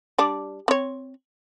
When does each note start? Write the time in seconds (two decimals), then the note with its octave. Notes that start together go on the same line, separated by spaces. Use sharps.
0.18 G3 D4
0.68 C4 C#5